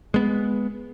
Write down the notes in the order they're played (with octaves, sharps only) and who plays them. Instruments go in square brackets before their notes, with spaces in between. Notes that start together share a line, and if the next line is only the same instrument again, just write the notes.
[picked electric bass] G#3 B3